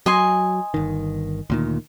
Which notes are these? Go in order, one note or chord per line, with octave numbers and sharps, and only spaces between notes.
F#3 D#5 G#5 C6
G1 D#3
D2 A#2 D#3